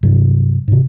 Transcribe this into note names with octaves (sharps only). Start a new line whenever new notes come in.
G2 C3 F#3
G#2 C3